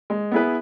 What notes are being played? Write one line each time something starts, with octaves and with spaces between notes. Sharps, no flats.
G#3
B3 E4 G#4 B4